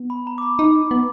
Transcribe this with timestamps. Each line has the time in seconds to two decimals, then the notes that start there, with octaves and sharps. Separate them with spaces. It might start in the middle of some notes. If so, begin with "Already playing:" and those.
Already playing: B3
0.10 B5
0.27 A#5
0.38 D6
0.42 B5
0.59 D#4
0.91 B3